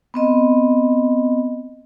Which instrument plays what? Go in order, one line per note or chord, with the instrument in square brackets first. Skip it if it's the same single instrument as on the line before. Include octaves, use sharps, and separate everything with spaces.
[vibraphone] B3 C4 D#5